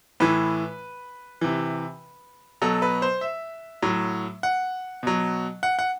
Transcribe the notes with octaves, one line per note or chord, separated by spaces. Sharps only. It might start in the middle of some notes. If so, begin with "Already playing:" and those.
A2 E3 B4
C3 E3
B2 F#3 A4
B4
C5
E5
A2 F#3
F#5
B2 F#3
F#5
F#5